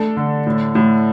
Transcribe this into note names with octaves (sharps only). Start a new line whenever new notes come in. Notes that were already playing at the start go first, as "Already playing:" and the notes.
Already playing: A3 D4 A4
D3
A2
A2